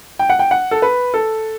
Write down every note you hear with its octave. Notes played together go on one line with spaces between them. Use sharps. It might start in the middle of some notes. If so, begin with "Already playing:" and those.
G5
F#5
G5
F#5
A4
B4
A4